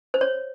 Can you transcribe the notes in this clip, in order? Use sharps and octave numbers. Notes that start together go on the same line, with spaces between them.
C5
C#5